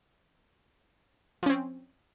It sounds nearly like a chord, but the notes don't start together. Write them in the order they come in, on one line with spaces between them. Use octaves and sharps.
F3 C#4 C4